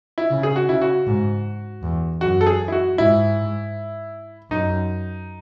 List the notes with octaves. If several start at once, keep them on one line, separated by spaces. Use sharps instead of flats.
E4
C#3
G#4
F#4
C#3 E4
F#4
G#2
E2
F#2 F#4
A4
G#4
E4
F#4
G#2 E4
F#2 D#4